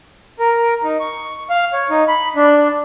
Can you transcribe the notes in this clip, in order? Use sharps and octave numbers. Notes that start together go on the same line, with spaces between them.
A#4
D#4
C#6
F5
C#5
D#4
B5
D4